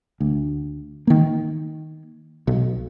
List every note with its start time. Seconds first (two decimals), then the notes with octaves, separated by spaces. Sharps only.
0.20 D2
1.07 D#3 A#3
2.47 B1